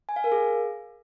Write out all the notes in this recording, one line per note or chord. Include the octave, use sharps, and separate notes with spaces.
G#5
F5
A#4
G#4